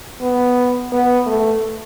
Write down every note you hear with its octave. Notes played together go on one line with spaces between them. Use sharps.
B3
B3
A3